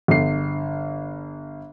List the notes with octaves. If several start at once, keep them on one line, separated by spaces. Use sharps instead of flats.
G1 C7